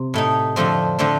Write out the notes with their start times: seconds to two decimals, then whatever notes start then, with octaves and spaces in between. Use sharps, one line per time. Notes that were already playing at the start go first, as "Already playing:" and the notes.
Already playing: C3
0.14 A2 A3 D#4
0.56 F2 D3 F3 A3 C4
0.99 D3 F3 A3 C4